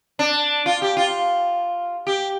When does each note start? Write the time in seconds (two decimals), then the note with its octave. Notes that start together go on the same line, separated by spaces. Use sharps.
0.19 D4
0.66 F4
0.82 G4
0.97 F4
2.07 G4